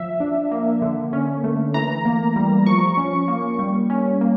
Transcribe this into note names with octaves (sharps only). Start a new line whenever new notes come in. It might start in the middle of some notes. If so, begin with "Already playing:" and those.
Already playing: F3 E5
D4
A#3
D3
C#4
A3
E3 A#5
A#3
G3
F3 C#6
C#4
A#3
G3
C#4
A#3